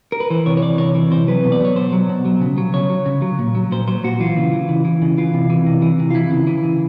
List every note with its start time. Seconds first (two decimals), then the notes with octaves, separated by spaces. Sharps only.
0.12 A#4
0.20 B4
0.30 E3 C5
0.46 C3 C#5
0.57 C#5
0.62 E3 D5
0.78 C3 C#5
0.95 E3
1.11 C3 C5
1.28 F#3 B4
1.44 B2
1.52 D5
1.60 F#3 C#5
1.76 B2 C5
1.93 F#3
2.09 B2
2.25 F#3
2.41 C#3
2.58 F#3
2.74 C#3 C#5
2.90 F#3
3.06 C#3
3.22 F#3
3.39 A#2
3.55 F#3
3.72 A#2 C5
3.88 F#3 C5
4.04 A#2 F#4
4.20 E3 F4
4.37 C#3
4.53 E3
4.69 C#3
4.85 E3
5.02 C#3
5.18 E3 F4
5.34 C3
5.50 E3
5.67 C3
5.82 E3
5.99 C3
6.10 F4
6.15 E3 E4
6.31 C#3
6.47 E3
6.64 C#3